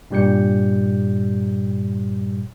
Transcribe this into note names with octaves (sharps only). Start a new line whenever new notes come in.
G2 A#2 G3 G4 G6 C#7